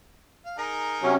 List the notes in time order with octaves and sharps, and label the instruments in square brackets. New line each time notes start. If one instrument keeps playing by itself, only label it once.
[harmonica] F5
D#4 G#4 A#4
[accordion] C3 F#3 C#4